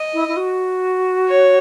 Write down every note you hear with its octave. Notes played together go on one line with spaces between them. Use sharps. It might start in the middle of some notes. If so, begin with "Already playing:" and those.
Already playing: D#5
E4
E4
F#4
C#5